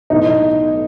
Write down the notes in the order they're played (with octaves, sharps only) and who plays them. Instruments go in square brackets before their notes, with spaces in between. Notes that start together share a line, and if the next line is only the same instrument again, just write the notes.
[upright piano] B1 A2 E3 D#4